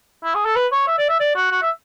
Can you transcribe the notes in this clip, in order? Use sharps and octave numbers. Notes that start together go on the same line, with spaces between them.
E4
G#4
A4
B4
C#5
E5
D5
E5
D5
F#4
F#4
E5